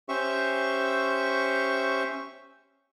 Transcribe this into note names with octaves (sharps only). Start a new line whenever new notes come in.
C#4 G4 C5 E5 C#6